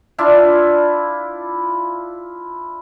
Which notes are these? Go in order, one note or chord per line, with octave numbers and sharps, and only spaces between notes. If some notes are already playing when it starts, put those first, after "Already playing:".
D4 E4 F4